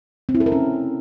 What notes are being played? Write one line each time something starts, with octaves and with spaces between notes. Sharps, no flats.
C4
E4
A4
A#4
C#4